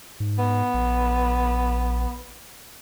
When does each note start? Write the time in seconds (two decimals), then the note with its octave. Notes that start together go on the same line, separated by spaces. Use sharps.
0.20 G#2
0.39 B3
0.74 A#1